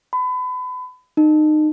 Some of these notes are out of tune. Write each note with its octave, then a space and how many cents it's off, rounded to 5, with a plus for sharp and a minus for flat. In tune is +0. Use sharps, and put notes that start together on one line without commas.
B5 +30
D#4 -25